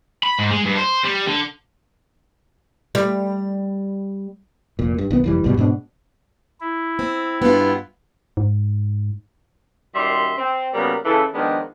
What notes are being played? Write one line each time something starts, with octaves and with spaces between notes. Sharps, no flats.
B5
G#2
G#3
G2
C5
G3
D3
G3
F1 A#2
G2
B1 D#3 B3
F1 E3 G3
C2 G#2 B2 G3
G#2 B2 C4 D4
E4
C4
G2 B3 F4
G#2
F#2 D#3 G3 E5 C6
C4
C#3 F#3 G3 A#3 B3 A#4
C#3 E3 A4
D#3 F3 G#3 B3 D4